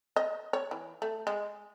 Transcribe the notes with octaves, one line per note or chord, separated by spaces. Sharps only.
D#5
C#5
E3
A3
G#3